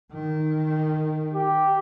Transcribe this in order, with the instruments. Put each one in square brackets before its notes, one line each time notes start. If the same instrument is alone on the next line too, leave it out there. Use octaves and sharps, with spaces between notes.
[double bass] D#3
[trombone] G4